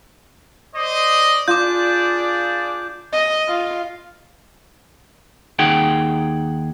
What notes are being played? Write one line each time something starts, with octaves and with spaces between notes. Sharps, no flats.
C5 D5 D#5
D4 F4 G#4 D5 D6 G6
D#5
F4
D#2 D#4 G#4 F#5 G5